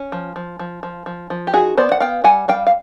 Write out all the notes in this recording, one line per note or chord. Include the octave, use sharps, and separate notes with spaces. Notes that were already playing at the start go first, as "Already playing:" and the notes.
Already playing: C#4
F3
F3
F3
F3
F3
F3
G4
D#4 F#4 G#4
B3 C5 D5
F#5
B3 F5 G5
G3 F#5 G#5
G3 F5 G5
F5